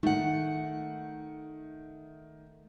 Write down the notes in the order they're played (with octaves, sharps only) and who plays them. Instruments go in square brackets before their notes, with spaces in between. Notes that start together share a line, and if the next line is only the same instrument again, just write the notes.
[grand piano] D#3 [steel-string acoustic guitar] A3 F#5